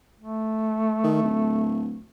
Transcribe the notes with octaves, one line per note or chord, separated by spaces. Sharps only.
A3
D#3
D1